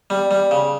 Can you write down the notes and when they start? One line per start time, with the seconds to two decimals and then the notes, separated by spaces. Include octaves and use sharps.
0.10 G3
0.31 G3
0.51 C#3